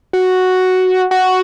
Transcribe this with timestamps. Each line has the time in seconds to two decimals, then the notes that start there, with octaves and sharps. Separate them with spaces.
0.13 F#4
1.11 F#4